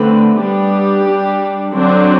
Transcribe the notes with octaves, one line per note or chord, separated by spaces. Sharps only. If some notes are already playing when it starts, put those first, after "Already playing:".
Already playing: D3 A3 C4 B4
G3 B3 D4 G4
G3 D4
D3 F#3 C4 D4